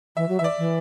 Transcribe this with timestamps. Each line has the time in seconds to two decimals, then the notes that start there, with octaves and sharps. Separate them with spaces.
0.16 E3 E5
0.29 F#3
0.39 E3 E5
0.44 D5
0.58 E3